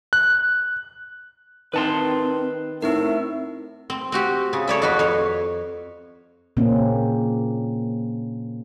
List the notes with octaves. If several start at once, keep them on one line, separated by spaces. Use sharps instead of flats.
F#6
D#3 C4 B4 A5 C6
A2 C4 D#4 A#4 E5
C4
C4 F#4 G4
C#3
A4 C#5 D5 E5
F2 F#4 B4
F2 C#5
A#2 C#3 A#3 C4 C#4